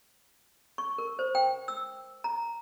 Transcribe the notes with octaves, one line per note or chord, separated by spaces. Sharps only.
C#6
A#4
C5
G5
E6
A#5